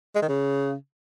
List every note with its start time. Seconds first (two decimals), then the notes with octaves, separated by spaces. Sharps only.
0.15 G#3
0.22 D#3
0.29 C#3